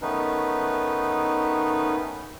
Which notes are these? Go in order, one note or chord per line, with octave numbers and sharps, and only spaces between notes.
D#3 A3 B3 C#4 D#4 B4